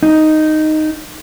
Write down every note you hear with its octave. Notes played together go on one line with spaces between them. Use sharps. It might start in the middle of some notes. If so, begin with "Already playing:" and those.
D#4